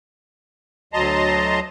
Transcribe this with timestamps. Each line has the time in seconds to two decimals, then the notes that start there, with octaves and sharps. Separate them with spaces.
0.93 D2 F#3 D#5 A5 A#5 C6